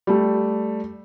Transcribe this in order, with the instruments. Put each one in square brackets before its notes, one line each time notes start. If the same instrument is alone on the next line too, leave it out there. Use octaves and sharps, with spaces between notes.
[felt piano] G3 A3